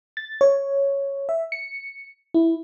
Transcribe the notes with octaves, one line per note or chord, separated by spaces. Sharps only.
A6
C#5
E5
C#7
E4